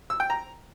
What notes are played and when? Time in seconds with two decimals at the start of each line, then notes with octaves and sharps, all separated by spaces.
0.10 E6
0.20 G5
0.30 A#5